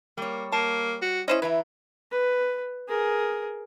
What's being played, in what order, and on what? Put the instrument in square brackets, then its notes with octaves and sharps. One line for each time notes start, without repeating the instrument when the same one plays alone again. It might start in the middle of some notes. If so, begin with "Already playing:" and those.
[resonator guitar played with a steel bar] G3 C#5 [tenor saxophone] A#3
[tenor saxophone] A#3 [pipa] A5
[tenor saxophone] F#4
[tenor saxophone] C#4 [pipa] E4 C5 D#5
[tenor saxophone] E3 [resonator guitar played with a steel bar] E4 E5 A#5 [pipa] B4
[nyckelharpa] B4
G#4 A#4